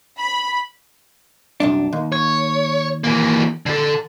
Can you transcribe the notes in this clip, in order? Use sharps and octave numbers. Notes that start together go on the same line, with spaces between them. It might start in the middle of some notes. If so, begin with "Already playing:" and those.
B5
C2 F#2 D4
D#2
C#5
E3 A#3
D3 A4